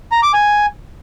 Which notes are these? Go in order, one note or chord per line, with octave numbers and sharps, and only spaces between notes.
A#5
D6
G#5